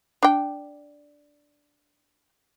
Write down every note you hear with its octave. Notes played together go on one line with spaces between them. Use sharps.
D4 G5